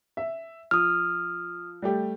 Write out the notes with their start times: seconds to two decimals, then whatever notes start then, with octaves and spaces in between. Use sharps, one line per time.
0.17 E5
0.71 F3 D#6 F6
1.82 G3 A3 G4